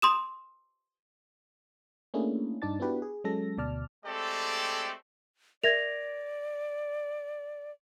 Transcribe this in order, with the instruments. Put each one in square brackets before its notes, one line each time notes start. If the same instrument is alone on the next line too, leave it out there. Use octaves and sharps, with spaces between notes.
[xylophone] C6 D#6 E7
[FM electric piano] A3 A#3 C#4 D4 E4 G#4
G2 D4 D#4 D5 A5 A6
B3 D4 E4 F#4 G4 B4
G#4
F#3 G#3 C#4 A4 A#6
D2 B2 D5 A5 F6
[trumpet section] G#3 A3 C4 G4 A4 D5
[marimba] A#4 E5 [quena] D5 [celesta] G#6 A#6 F7